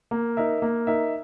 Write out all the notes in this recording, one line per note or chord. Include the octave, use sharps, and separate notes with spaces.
A#3
D#4 A#4 E5
A#3
D#4 A#4 E5